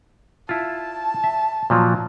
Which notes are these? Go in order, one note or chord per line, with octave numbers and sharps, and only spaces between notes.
E4 F4 A5
E5
A#2 F3 F#3